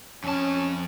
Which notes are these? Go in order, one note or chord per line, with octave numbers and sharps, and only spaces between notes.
F2 C#4 A5